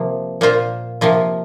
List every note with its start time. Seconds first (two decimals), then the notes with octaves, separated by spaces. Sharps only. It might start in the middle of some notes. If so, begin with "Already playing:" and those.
Already playing: C3 F3 A#3
0.41 A#2 A#3 F4 C5
1.01 C3 F3 A#3 F4